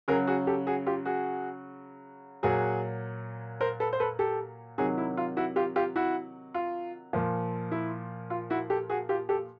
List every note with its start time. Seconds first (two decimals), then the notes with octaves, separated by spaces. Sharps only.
0.08 C#3 F#3 G#4 A#4
0.27 F#4 G#4
0.47 G4 A4
0.67 F#4 G#4
0.86 F4 G4
1.05 F#4 G#4
2.43 A#2 F#3 F#4 G#4
3.61 A#4 C5
3.80 A4 B4
3.93 C5
4.00 A4 B4
4.19 G4 A4
4.78 C3 D#3 F#3 F#4 G#4
4.98 E4
5.17 F4
5.37 E4 F#4
5.56 F4 G4
5.76 F4 G4
5.96 E4 F#4
6.54 F4
7.13 A#2 F3
7.72 E4
8.30 F4
8.50 E4 F#4
8.70 G4 A4
8.90 F#4 G#4
9.09 F4 G4
9.29 G4 A4